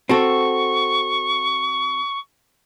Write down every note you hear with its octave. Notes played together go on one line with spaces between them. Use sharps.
C4 F#4 A4 C#6